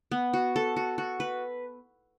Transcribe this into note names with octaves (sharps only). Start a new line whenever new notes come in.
B3
F#4
A4
F#4
F#4
B4